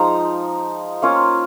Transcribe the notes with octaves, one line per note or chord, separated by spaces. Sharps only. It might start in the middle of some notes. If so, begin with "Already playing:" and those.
Already playing: F3 G#3 D#4 A#5
A#3 C#4 F4